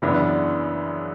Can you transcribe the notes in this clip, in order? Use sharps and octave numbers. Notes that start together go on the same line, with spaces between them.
F#2 C#3 E3 B3 D4